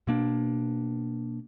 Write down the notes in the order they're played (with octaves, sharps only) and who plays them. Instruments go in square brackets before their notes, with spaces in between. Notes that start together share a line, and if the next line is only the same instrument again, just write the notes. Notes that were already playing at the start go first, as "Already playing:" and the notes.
[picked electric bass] B2 A#3 D4